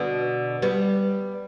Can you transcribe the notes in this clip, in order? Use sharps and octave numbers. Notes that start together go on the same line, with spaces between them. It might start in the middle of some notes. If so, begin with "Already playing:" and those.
Already playing: B2 D3
G3 B3